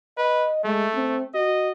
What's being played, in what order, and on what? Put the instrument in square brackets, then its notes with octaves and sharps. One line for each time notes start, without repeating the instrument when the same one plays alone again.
[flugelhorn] B4 [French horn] D#5
[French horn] G#3 [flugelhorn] A3
[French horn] C4
[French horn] F#4 [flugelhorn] D#5